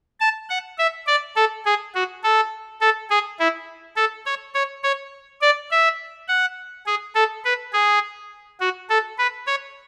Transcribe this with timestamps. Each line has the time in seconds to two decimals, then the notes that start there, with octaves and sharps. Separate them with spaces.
0.20 A5
0.49 F#5
0.78 E5
1.07 D5
1.36 A4
1.65 G#4
1.95 F#4
2.23 A4
2.81 A4
3.10 G#4
3.39 E4
3.96 A4
4.26 C#5
4.55 C#5
4.84 C#5
5.41 D5
5.71 E5
6.28 F#5
6.86 G#4
7.15 A4
7.44 B4
7.73 G#4
8.60 F#4
8.90 A4
9.18 B4
9.47 C#5